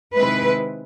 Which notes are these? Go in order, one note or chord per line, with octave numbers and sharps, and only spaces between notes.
C3 D#3 G#3 C4 E4 B4